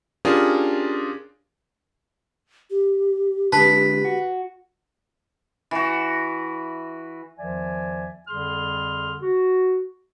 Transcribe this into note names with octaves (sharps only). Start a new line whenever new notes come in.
C#4 D4 F4 G4 G#4 A#4
G4
D3 G#3 B4 A5 B5
F#4
E3 F#4
E2 D#3 F3 D5 E5 G#5
F2 D3 G3 G#4 C6 F6
F#4